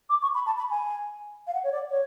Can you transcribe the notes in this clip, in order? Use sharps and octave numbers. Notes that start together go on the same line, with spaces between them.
D6
C#6
B5
A5
B5
G#5
F5
F#5
C#5
D5
C#5